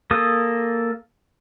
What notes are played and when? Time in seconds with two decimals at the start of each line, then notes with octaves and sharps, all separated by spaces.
0.11 A#3 A4 D#6